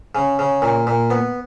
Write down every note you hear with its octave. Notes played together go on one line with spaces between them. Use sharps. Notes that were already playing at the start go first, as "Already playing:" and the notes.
C#3
C#3
A#2
A#2
B3